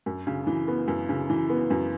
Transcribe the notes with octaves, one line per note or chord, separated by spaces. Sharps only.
F#2
C#3
E3
B3
F#2
C#3
E3
B3
F#2